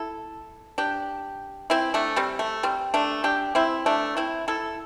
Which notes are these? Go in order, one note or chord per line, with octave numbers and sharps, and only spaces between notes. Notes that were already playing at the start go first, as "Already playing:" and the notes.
Already playing: E4 A4
D4 G4
C4 E4
A3 D4
G3 C4
A3
G3 C4
A3 D4
D4 G4
C4 E4
A3 D4
C4 E4
E4 A4